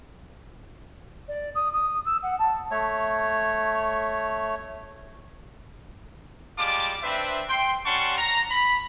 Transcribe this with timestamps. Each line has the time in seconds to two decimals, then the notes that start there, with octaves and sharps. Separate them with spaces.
1.28 D5
1.55 D#6
1.72 D#6
2.05 E6
2.23 F#5
2.39 A5
2.71 A3 C#5
6.58 G3 G#3 F4 A5 D6
7.03 C4 D4 B4 C5 E5
7.49 G5 C6
7.86 G3 C#4 F#5 A5 C6 C#6
8.18 A#5
8.51 B5